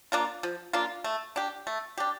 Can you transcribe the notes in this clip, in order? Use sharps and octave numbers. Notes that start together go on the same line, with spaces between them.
A#3 D4 F4
F3
A#3 D4 F4
A3
D4 G4
A3
D4 G4